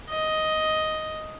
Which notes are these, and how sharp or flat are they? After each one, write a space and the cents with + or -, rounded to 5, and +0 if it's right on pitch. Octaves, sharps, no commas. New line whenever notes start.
D#5 +5